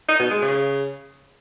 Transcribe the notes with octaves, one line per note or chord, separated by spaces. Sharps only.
D#4
B2
G#3
C#3